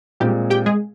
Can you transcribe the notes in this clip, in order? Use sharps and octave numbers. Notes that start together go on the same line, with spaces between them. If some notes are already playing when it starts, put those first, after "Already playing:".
A#2 G3 G#3 C4 G4
G4 G5
G#3 G#4